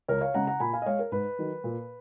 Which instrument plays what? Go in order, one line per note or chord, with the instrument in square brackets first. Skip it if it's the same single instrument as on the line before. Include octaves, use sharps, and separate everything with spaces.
[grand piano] C#2 A#4 C#5
C#5 F5
C#3 G#3 F#5 A#5
F#5 A#5
A#2 G#5 B5
F5 G#5
D#5
G#3 C#5 F5
A#4
G#2 B4
D#3 F#3
A#2